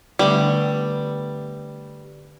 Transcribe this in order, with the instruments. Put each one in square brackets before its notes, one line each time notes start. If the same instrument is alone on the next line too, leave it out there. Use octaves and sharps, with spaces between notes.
[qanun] D3 A3 B3 [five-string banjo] G3